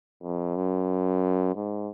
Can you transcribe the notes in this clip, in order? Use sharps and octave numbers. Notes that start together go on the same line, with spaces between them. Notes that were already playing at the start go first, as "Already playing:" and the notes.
F2
F#2
G#2